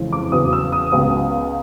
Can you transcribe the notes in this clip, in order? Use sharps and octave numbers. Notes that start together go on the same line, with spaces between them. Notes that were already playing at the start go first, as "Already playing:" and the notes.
Already playing: F2 C#3 E3 G#3
D6
E2 C#3 F#3 D#6
E6
D#6
C#2 C#3 F#3 B3 D#6